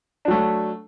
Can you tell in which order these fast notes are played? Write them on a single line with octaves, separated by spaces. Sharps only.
D4 F#3 A3